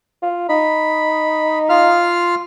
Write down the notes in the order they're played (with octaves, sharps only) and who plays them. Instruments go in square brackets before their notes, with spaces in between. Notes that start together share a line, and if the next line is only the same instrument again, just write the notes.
[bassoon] F4
[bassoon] D#4 [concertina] B5
[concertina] F4 F5 F6